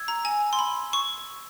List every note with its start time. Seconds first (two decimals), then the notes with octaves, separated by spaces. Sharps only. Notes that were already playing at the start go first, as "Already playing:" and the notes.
Already playing: E6 G#6
0.08 A#5
0.25 G#5
0.53 C6
0.59 B5
0.93 C#6